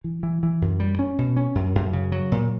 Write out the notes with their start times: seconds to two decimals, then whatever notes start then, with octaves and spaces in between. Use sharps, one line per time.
0.04 E3
0.23 E3
0.43 E3
0.62 F#2
0.80 G3
0.99 C#4
1.18 B2
1.37 C#4
1.55 F#2
1.75 F#2
1.93 C#3
2.12 F#3
2.32 A#2